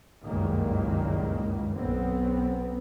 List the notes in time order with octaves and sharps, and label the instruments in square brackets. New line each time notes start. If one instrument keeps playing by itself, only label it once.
[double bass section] F#1 C#2 G2 A#2 D#3 A#3
B1 B3 C4